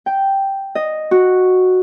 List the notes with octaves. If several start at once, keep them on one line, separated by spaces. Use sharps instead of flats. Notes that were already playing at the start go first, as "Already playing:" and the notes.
G5
D#5
F#4